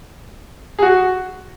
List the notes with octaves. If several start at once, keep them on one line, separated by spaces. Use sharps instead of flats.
G#4
F#4